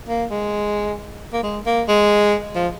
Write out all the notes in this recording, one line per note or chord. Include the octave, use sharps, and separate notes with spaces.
A#3
G#3
A#3
G#3
A#3
G#3
F3